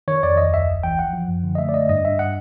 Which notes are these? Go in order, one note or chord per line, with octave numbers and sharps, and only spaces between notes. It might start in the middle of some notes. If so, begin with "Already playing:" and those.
D#3 C#5
F2 D5
D2 D#5
D2 E5
G1
E3 G5
F3 F#5
F3
F#2
D3
D#5
A3 E5
D5
A3 D#5
G2 D#5
G2 E5
F#5